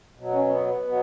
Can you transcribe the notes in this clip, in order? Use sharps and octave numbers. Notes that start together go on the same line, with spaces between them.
B2 F#3
C#4
C#4
B3
B3
B2 F#3